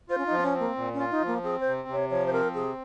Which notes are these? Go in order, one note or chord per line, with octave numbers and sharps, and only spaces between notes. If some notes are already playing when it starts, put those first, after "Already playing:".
F4 C5
C#4
D#4
F3
C4
C#4
C4
A#3
A#2
C#4
F4
D#4
F3
A#3
C4 G#4
C5
C3
C3 C#5
F3 C#5
C5
C4 A#4
C3 G#4